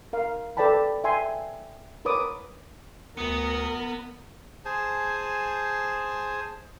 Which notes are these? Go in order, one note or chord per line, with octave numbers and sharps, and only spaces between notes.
A#4 F5
A4 B4 D5 G5 A5 B5
E5 G5 G#5 C6
A#4 B4 C#5 D6 D#6
D2 B3 A#4 D#6 C#7
G#4 C5 G#5 A5